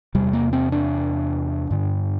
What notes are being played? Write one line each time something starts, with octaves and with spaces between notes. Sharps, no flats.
E2 C3 G3
A#3
C4
D4
G2 D3